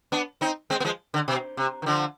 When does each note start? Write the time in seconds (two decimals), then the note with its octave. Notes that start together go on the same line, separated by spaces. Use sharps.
0.12 B3 D4
0.41 C4 D#4
0.70 G#3 C4
0.80 B3
0.84 F3 G#3
1.14 D3
1.28 B2
1.57 C3
1.82 D#3
1.86 D3 F3